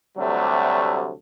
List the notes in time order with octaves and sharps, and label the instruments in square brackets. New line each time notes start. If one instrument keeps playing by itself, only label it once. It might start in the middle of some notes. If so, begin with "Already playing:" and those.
[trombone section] D2 C3 F#3 G3 A3 A4